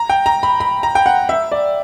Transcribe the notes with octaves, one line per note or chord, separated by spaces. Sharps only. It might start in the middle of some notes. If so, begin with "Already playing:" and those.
Already playing: A#5
G5
A#5
B5
B5
A#5
G5
F#5
E5
D5